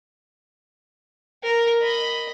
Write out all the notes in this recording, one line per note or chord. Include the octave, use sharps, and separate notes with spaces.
A#4
D#5 B5